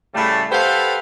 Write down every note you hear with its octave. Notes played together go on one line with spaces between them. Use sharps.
A2 C#3 G3 A3
G4 A4 B4 C5 F5 F#5